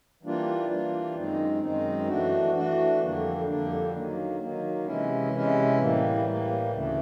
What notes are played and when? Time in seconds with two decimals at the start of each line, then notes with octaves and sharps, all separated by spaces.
0.23 E3 G3 A#3 D4 F4
0.69 E3 G3 A#3 D4 F4
1.16 F#2 D#3 G#3 C4 D#4
1.62 F#2 D#3 G#3 C4 D#4
2.08 E3 A3 D4 F#4
2.54 E3 A3 D4 F#4
3.01 F2 D3 G3 A#3 D4
3.47 F2 D3 G3 A#3 D4
3.93 D#3 F#3 A#3
4.40 D#3 F#3 A#3
4.85 C3 E3 G#3 C#4 E4
5.32 C3 E3 G#3 C#4 E4
5.78 A2 E3 G3 A#3
6.25 A2 E3 G3 A#3
6.72 D2 C#3 E3 A3